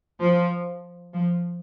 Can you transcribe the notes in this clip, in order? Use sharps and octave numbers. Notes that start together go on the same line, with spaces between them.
F3
F3